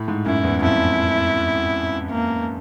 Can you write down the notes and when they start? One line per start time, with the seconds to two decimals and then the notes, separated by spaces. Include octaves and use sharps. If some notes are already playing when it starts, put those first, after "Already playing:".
Already playing: A2
0.08 G#2
0.25 F#2 E4
0.44 E2
0.62 F2 E4
2.11 A#3